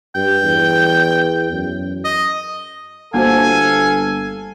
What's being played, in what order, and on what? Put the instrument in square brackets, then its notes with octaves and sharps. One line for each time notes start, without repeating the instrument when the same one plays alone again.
[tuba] G2 [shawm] G5
[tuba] E2
F#2
[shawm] D#5
[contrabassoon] G1 [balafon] A#3 F#4 C5 [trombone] A4 [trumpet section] F5 G#5